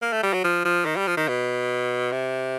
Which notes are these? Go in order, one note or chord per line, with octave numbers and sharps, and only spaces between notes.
A#3
A3
G3
F#3
F3
F3
D#3
G3
F3
D#3
B2
C3